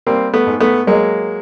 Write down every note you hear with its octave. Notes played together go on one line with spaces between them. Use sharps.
G3 A#3 C4
A3 B3
G#2
A3 B3
F#3 G#3 A#3